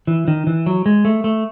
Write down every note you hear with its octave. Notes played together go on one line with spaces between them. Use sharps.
E3
D#3
E3
F#3
G#3
A3
A3